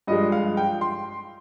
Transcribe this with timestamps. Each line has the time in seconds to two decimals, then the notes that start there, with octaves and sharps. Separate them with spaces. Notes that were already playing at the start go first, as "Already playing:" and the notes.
0.07 G2 F3 G#3 D#5
0.32 F5
0.57 G5
0.81 C6